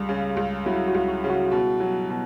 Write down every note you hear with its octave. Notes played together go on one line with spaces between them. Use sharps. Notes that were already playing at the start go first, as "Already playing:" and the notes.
Already playing: C#2 G3
C#3
C#2
F#3 E4
F#4
C#2
F#4
C#3
F#4
B2
F#3
B2